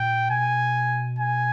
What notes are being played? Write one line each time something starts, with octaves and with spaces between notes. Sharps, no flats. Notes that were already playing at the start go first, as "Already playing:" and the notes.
Already playing: A#2 G5
B2 G#5
G#5